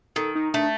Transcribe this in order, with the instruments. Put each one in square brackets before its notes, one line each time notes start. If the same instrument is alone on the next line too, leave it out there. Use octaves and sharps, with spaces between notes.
[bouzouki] D#3 [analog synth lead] A4
[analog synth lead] D#4
[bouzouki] A3 [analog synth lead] D4